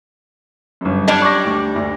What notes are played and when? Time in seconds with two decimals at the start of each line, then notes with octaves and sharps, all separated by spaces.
0.81 G1 F#2
1.08 G3 D4 D5 A5 G#6
1.22 C#6 D6 A#6
1.45 D2
1.76 D2